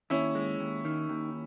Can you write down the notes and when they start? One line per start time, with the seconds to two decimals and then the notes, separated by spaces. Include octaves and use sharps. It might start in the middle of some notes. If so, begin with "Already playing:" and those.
0.10 D#2 C#4 E4
0.35 G#3
0.60 D#2
0.85 D#3
1.09 D#2